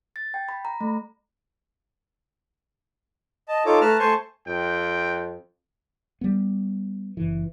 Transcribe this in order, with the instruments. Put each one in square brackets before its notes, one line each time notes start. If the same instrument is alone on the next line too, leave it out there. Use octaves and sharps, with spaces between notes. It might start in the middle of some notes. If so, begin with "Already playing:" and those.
[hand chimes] A6
G5
B5
A#5
A3
[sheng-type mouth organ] D#5 A5
D#4 F4 A4 C#5 D6
A3 B4 A5 A#5 F6
A3 C5 G#5 A5 C6 C#6
[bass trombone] F2 [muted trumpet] G5
[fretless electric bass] G3 B3
F#1 E3